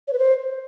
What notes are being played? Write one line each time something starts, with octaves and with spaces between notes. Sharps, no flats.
C#5
B4
C5